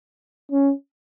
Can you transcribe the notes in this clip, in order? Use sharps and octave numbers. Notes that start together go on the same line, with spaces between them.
C#4